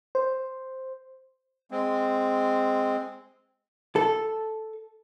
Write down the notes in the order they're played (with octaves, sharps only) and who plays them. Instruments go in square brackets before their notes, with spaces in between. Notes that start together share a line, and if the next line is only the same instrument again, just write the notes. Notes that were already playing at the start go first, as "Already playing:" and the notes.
[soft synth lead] C5
[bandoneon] G#3 C4
[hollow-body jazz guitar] A4